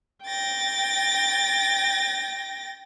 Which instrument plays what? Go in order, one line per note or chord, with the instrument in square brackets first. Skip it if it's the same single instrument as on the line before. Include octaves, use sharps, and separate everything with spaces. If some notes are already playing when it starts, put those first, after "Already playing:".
[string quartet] G5 A6 A#6